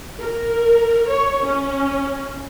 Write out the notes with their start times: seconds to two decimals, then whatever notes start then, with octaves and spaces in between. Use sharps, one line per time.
0.20 A#4
1.09 C#5
1.45 C#4